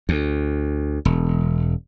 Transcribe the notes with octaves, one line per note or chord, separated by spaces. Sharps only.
D2
E1